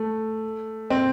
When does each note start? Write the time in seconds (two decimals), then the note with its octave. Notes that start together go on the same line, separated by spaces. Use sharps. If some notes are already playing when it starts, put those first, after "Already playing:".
Already playing: A3
0.90 C4